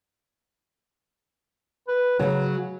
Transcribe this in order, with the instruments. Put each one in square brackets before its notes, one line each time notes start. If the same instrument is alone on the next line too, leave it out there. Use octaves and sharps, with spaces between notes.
[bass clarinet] B4
[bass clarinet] C#3 [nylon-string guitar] F#3